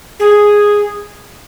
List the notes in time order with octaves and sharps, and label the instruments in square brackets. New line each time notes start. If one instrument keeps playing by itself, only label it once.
[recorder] G#4